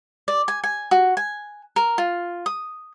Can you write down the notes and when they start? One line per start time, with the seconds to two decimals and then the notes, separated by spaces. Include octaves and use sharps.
0.28 D5
0.48 G#5
0.64 G#5
0.91 F#4
1.17 G#5
1.76 A#4
1.98 F4
2.46 D#6